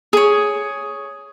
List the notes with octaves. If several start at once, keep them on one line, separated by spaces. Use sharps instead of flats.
G#4 C#5